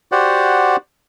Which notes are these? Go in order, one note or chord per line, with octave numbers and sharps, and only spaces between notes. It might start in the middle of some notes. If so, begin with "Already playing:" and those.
F#4 G4 C5 D5 F#5